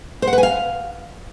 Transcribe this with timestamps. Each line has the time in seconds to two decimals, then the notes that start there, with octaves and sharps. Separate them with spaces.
0.22 C5
0.27 F#5
0.33 B4
0.38 G#5
0.43 F5